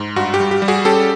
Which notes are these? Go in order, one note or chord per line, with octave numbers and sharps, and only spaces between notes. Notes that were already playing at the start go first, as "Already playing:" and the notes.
Already playing: G#2
G2 F#4
G4
G3
G4
G3
F#4 G#4
C#4 G4 A4